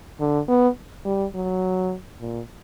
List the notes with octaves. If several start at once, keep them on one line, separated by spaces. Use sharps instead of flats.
D3
B3
G3
F#3
A#2